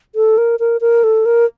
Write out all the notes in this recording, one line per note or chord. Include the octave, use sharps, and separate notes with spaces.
A4
A#4
A#4
A#4
A4
A#4